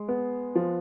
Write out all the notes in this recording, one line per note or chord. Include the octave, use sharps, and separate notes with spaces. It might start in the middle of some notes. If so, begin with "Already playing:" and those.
Already playing: G#3
B3
F3